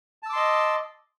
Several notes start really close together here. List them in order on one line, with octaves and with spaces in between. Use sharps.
A5 E6 D6 C6 D#5